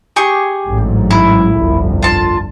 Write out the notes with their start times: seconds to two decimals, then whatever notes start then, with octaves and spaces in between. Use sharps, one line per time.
0.16 G4 G#4 C#6
0.66 A1 G#2 F#3
1.11 E4
1.54 G1 C2 F2
2.02 F4 A5